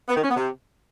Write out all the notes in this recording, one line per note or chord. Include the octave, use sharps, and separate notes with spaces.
B3
D#3
C#4
B3
C3